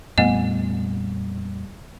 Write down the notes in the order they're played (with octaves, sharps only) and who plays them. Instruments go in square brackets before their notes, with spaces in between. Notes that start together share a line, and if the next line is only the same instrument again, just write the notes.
[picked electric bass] F2 A#2 G3 [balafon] A3 B3 D#5